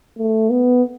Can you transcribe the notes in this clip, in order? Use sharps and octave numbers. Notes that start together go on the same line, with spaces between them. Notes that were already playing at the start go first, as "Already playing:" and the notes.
A3
B3